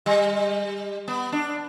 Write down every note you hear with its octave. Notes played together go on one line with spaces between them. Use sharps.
G3
B3
D4